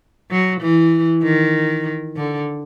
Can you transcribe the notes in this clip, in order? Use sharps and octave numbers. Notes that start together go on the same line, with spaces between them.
F#3
E3
D#3
D3